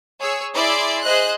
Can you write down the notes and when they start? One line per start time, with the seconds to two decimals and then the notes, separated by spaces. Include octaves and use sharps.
0.20 G#4 C#5 E6
0.55 E4 G#4 D5 E5 C6 D6
1.02 G#4 C5 D#5 F#6